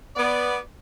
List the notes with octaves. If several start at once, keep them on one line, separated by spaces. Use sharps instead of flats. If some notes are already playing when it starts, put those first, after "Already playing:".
B3 D5